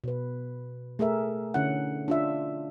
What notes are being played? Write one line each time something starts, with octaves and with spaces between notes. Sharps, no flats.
B2 B4
A3 G#4 A#4 E5
D3 C#4 E4 F#5
D4 F4 E5